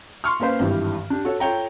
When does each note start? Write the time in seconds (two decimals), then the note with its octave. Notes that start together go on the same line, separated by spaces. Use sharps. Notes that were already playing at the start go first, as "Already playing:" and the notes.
0.24 C6 C#6 F6
0.40 A#3 C#4 B4 C5 F5
0.59 G#1 G2 E3 G4
1.10 D4 G4
1.25 F#4 A4 C#5
1.40 F4 A4 C#5 G5 A#5